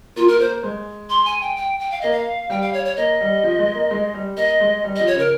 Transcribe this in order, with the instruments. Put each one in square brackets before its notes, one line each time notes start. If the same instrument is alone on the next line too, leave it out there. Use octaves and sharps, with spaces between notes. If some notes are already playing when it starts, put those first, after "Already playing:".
[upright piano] A#3 [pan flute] F4
[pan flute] A#4
[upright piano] A#3 [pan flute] C5
[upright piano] G#3
[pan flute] C6
G#5
G5
G5
G5
F5
[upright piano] A#3 [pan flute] D#5
[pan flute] F5
[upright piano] G3 [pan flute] G5
[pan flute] F5
C#5
C#5
[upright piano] A#3 [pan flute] D#5
[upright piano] G3
F3
G#3
A#3
G#3
G3
[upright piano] A#3 [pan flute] D#5
[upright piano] G#3
G3
[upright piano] F3 [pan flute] D#5
[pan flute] C#5
[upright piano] C#3 [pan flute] A#4